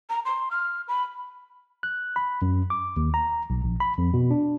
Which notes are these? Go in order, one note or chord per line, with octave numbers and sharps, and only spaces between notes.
A#5
C6
F6
B5
F#6
B5
F#2
D6
D#2
A#5
B1
A#1
B5
F2
B2
D4